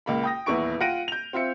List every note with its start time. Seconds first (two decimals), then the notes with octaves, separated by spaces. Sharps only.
0.06 C#2 A#3 B5
0.24 G5 D#6 A#6
0.46 D#1 E2 B3 E4 C#6 D7
0.80 F4 F#5 G5 A#6 D7 D#7
1.08 G6 F7
1.33 C4 F4 E5 C#7